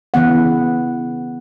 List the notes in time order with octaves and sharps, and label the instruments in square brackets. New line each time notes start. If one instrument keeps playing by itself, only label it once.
[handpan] C#3 E3 B3 F#5